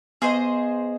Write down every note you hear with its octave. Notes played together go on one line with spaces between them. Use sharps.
B3 G#4 C5 D#5